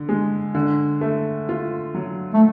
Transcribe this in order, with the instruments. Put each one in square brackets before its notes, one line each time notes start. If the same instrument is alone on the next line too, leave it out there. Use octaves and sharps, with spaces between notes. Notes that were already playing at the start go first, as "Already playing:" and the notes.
Already playing: [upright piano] D3
G#3
D3
A3
F4
F#3
[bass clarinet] A3